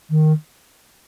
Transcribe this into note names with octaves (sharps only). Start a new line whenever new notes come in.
D#3